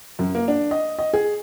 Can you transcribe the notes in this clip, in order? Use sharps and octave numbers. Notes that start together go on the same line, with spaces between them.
F#2
A#3
D4
D#5
D#5
G#4